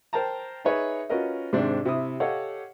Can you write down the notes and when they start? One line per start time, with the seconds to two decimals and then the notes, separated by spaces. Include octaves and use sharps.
0.13 A#4 C5 G5 A5 A#5
0.65 D#4 G#4 B4 C#5 E5
1.09 C#4 F4 F#4 A#4 B4 D#5
1.53 G#2 C3 D#3 C4 D4
1.85 C3 E4 D#6
2.20 G4 A4 C#5 D#5 F5 F#5